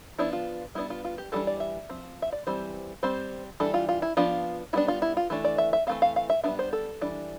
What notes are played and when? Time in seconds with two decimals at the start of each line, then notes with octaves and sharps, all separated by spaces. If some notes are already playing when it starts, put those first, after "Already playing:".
0.19 F3 B3 D4 E4
0.33 F4
0.75 G3 B3 D4 E4
0.90 F4
1.04 F4
1.18 G4
1.32 E3 G3 D4 A4
1.47 D5
1.60 E5
1.89 F3 C4
2.22 E5
2.32 D5
2.47 E3 G3 C4 C5
3.03 G3 C4 C5
3.60 E3 G3 D4 A4
3.74 F4
3.89 F4
4.02 E4
4.17 F3 B3 D4 F4
4.73 G3 B3 D4 E4
4.88 F4
5.02 E4
5.17 F4
5.30 E3 A3 D4
5.45 D5
5.58 E5
5.73 E5
5.87 E3 A3 C4 F5
6.02 F5
6.16 F5
6.30 E5
6.43 G3 B3 D4 E5
6.59 C5
6.73 A4
7.01 E3 G3 D4